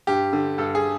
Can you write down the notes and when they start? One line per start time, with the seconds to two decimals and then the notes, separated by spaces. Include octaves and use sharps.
0.07 G2 G4
0.33 D3
0.58 G2 A4
0.75 G#4